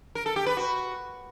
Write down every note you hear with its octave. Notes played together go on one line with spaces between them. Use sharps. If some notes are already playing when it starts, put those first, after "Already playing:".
A#4
A4
G4
B4
F#4